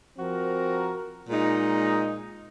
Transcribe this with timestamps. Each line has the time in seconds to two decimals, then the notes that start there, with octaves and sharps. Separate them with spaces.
0.17 F3 C4 F#4 A#4
1.30 A#2 G#3 D#4